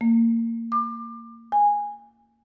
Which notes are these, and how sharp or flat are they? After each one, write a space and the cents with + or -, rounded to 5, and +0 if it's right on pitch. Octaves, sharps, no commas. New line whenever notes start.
A#3 -25
D6 +25
G#5 -10